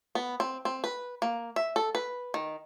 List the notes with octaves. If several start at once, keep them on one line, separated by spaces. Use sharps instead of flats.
B3
C4
C4
B4
A#3
E5
A4
B4
D#3